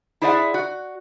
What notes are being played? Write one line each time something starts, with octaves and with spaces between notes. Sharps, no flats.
E4 G#4 C5 D5 E5 F#5
F#4